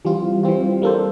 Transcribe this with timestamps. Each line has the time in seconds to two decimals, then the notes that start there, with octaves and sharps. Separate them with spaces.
0.05 E3 G3 C4 F4
0.43 E3 G3 C4 F4
0.82 G3 A#3 D4 A4 C5